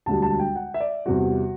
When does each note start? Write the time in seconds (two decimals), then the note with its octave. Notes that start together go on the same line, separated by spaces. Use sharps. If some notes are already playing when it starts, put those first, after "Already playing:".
0.06 E1 D2 D3 G3 A5
0.22 A5
0.39 G5
0.56 F#5
0.74 E5
0.80 D5
1.06 E2 C3 G3 F#4